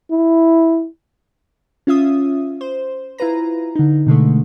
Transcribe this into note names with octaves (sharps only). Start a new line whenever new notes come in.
E4
C#4 F4 E5 D#6
C5
E4 F4 B4 A#5
D3 D#4
B2 D3 G#3 A3